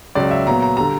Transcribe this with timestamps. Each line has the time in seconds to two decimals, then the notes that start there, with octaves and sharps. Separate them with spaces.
0.15 C#2 C#3 F#3 D5
0.31 E5
0.46 A#2 F#3 B3 A#5
0.62 A#5
0.77 D3 G3 A#5